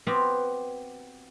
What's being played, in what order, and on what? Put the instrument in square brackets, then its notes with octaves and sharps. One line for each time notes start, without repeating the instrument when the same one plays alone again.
[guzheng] B3 C4 F#4 G4 F5